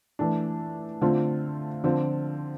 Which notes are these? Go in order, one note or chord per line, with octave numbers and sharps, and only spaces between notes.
E3 A3 D4
D3 A3 C4 F4
D3 F3 C4 F4